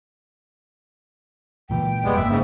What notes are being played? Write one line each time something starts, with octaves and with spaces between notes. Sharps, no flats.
C#2 A#2 E3 G5
E1 G3 G#3 B3
G1 A#3 E5
G#2 C#3